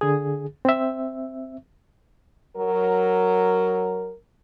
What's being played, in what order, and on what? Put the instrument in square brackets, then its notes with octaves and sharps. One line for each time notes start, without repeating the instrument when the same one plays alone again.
[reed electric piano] D3 G#4
C4 E5
[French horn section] F#3 A#4